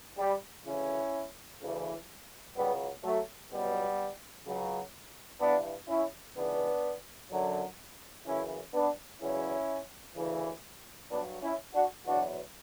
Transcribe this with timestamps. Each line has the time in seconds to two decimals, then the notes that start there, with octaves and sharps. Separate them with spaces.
0.19 G3
0.66 D2 C#3 E3 C#4 E4
1.61 D2 C#3 E3
2.56 C#2 C#3 F#3 G3 B3
3.04 F#3 A3
3.51 C#2 B2 F#3 G3 B3
4.46 C#2 C#3 F#3
5.41 G2 E3 B3 D4
5.89 C#4 E4
6.36 C#2 C#3 E3 B3 D4
7.31 F#2 D3 F#3
8.26 F#2 C#3 E3 C#4 E4
8.74 B3 D4
9.21 E2 C#3 F#3 C#4 E4
10.16 D2 C#3 E3
11.11 G2 F#3 B3 D4
11.43 C#4 E4
11.74 D4 F#4
12.06 E2 B2 F#3 D4 F#4